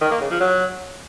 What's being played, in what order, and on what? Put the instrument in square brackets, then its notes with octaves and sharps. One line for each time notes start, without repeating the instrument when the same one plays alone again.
[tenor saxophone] D#3
A#3
C#3
F3
F#3